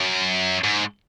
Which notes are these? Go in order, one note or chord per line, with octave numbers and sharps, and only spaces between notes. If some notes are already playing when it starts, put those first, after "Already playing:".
Already playing: F#2
G#2